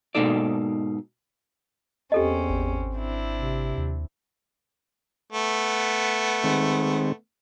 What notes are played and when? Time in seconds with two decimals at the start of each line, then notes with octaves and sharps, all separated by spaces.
0.15 G#2 B2 A#3 D#4 A4 D5
2.12 E2 C4 C#4 G4 A4 D#5
2.49 G#1
2.95 C4 D4 E4
3.37 C3
3.77 D#2
5.33 A3 B3
6.44 D#3 G#3 C4